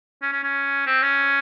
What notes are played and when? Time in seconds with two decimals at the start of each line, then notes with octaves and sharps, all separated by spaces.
0.22 C#4
0.32 C#4
0.44 C#4
0.87 C4
1.03 C#4